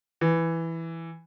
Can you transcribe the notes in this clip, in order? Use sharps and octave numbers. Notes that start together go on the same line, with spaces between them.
E3